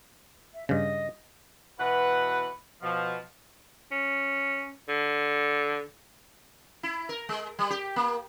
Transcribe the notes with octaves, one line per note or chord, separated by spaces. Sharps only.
E5
G2 C#3 D#5
B2 E3 B4 F#5
B2 F3
C#4
D3
E4
A#4
G#3
G3
G4
A#3